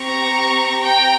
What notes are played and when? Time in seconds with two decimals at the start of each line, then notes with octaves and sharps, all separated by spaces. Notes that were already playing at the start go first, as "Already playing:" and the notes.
Already playing: C4 G4 A#5 C#6
0.82 G5 A#5